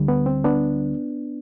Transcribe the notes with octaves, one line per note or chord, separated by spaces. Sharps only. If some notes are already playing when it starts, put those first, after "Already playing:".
Already playing: D2 D3 G3
B3
C4
B3 D4